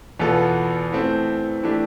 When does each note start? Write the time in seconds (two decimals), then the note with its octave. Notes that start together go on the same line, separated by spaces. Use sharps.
0.19 E2 B2 B3 F4 A4
0.92 E3 A3 C4
1.63 E3 A3 D4 G4